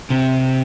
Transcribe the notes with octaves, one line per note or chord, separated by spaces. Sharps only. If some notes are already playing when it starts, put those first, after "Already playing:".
C3